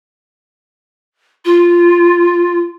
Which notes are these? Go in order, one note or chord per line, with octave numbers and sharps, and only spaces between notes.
F4